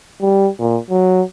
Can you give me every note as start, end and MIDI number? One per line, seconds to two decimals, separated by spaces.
0.21 0.49 55
0.60 0.78 46
0.90 1.22 54